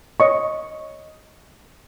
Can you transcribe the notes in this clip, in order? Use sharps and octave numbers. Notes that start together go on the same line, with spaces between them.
C#5 D#5 C#6